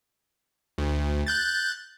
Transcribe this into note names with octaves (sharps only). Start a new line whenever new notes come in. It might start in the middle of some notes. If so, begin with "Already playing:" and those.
D2
F#6 G6 A6